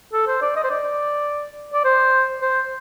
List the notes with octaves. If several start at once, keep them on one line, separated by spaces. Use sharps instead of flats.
A4
C5
D5
D#5
C5
D5
D5
C5
C5